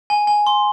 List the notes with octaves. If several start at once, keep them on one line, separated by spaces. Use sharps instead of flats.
G#5
G#5
C6